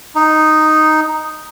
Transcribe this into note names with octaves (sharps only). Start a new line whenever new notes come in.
D#4